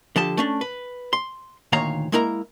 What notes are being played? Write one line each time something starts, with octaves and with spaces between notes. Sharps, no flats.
D3 F3 G4 A5
A3 C#4 D4
B4
C6
D2 A#2 D#3 C#5 F5 A#5
G#3 A#3 E4 A#4 A#5